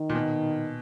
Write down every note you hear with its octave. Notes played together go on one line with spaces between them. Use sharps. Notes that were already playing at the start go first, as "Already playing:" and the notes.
Already playing: D#3
A#2
B2